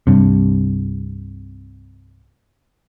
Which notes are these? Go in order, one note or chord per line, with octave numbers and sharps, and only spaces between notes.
C2 G2 C3